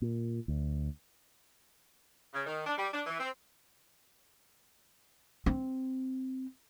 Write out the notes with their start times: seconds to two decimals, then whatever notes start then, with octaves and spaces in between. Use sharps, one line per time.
0.02 A#2
0.48 D2
2.34 C#3
2.46 D#3
2.67 D4
2.78 G3
2.94 D4
3.07 E3
3.20 C4
5.46 C4